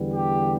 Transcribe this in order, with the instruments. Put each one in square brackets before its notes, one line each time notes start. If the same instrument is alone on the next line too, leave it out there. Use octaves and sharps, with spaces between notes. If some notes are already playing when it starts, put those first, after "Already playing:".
Already playing: [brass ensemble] E2 D3 G3 B3
G4